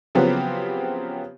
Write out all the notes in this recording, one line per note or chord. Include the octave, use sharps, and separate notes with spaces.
C#3 F3 F#3 B3 C4 G4